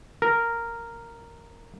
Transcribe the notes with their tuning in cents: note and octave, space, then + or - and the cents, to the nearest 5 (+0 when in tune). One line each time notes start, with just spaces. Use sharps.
A#4 -5